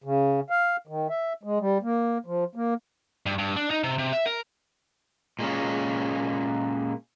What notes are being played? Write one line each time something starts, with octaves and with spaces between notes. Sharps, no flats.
C#3
F5
D#3
E5
G#3
G3
A#3
F3
A#3
G2
G2
D4
D#4
C3
C3
E5
A#4
A#2 G#3 A#3 C#4